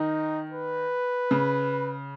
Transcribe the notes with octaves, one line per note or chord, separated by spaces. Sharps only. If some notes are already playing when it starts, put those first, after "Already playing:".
Already playing: D#3 D#4
B4
C#3